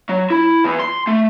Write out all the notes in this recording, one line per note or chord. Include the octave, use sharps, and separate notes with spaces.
F#3
E4
E2
C6
A3